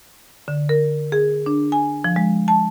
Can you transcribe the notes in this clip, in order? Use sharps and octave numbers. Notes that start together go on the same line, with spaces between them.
D3
A#4
G#4
D4
G#5
F3
G#3
A5